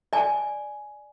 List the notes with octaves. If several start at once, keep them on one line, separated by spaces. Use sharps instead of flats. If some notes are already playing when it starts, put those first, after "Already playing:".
D5 G#5